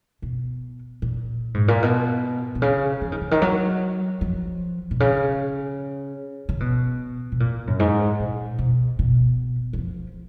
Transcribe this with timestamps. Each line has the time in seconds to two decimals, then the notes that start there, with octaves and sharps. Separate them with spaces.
0.22 B2
1.02 A#2
1.54 G#2
1.68 A#2
1.83 B2
2.55 B2
2.62 C#3
3.01 F3
3.12 D#3
3.21 C#3
3.31 D#3
3.42 F#3
4.21 F3
4.91 B2
5.00 C#3
6.49 C#3
6.60 B2
7.32 B2
7.40 A#2
7.67 F#2
7.79 G#2
8.20 A#2
8.59 B2
8.99 B2
9.73 F#3
9.78 F3